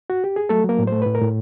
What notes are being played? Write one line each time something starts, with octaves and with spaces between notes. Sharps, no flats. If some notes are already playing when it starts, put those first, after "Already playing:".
F#4
G4
G#4
F#3 A3 A4
F#3
A#3 A#4
A2
A3 C5
A2 B4
A#4
A2